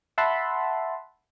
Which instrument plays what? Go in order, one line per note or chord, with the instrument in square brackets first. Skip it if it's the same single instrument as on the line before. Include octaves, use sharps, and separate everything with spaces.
[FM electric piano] E5 F#5 A5 B5 C6